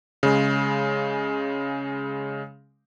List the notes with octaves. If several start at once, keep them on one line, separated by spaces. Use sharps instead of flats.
C#3 G#3